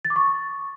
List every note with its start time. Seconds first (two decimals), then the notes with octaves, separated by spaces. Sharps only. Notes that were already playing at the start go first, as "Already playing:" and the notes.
0.05 A6
0.10 D6
0.16 C#6